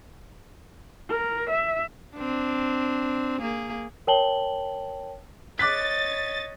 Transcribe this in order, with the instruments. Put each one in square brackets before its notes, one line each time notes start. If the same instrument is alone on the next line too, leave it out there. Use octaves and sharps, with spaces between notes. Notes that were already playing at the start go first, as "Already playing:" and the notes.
[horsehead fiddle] A#4
E5
[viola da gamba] C4 D4
A#3 G#4
[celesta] A#4 C#5 G5 A5 F#7 G7
[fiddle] C#5 D#5 [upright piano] D6 F#6 B6 [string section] A6